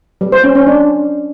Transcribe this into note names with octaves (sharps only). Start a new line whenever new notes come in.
G3
C5
C#4
C#4
D4